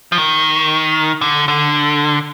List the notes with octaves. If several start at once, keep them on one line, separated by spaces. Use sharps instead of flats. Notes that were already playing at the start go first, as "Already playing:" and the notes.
F3
D#3
D3
D3